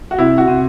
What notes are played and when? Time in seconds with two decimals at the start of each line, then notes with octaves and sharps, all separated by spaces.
0.11 F#4
0.18 C3 E4
0.38 F#4
0.48 C3